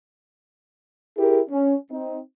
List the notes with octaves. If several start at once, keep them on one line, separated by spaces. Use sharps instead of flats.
E4 G4 G#4 A#4
C#4
C4 D#4